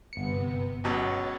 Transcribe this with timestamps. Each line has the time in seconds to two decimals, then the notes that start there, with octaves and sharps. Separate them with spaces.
0.13 G1 C3 B3 C#7
0.84 C#2 B2 F#3 C#5 D#5 A6